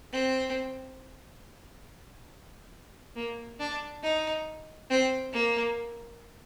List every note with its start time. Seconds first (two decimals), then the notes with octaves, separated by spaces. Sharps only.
0.12 C4
3.16 A#3
3.60 D4
4.03 D#4
4.90 C4
5.33 A#3